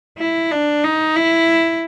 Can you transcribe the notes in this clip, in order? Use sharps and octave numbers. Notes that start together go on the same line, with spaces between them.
E4
D4
D#4
E4